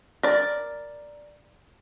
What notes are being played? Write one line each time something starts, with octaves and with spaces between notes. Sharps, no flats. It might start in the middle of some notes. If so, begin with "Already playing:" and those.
A#4 D5